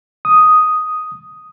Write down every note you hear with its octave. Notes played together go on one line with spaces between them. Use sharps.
D#6